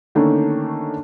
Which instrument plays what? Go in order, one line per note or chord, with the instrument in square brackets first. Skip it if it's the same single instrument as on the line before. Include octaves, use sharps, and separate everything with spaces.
[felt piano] D3 D#3 A3 A#3 C#4 D4